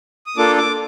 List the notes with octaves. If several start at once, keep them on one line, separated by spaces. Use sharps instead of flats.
D#6
A#3 D4 F4 A4 D6
D6